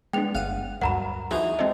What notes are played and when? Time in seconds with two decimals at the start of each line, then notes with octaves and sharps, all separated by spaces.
0.13 G#3 B3 D4 G5 F7
0.35 G1 F5 F#5 D#7
0.81 D2 G2 F#3 A#4 F#5 A#5 B5
1.31 E3 F3 D#4 F#4 G#4 D#5
1.59 G#3 C4 A4 D#5